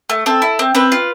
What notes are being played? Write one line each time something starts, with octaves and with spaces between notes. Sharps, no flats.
A3
C4 A4
E4
C4
C4 B4
F4